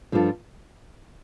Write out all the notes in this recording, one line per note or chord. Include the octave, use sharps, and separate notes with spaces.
G2 F3 D4 F4 A4